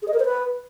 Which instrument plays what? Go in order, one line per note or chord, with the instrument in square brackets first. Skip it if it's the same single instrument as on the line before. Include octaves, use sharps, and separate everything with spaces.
[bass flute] G#4
D#5
A#4
C5
B4